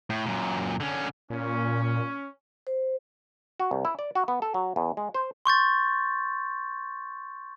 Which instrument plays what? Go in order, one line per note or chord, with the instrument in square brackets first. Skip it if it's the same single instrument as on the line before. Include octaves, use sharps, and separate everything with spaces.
[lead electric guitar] A2
F#2 A#2
D3 C#4
[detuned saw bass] A#2 [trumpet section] C#4
[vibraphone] C5
[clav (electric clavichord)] F#4
C2
E4
D5
F#4
B3
A4
F#3
E2
G#3
C5
[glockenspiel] C6 C#6 G6 A6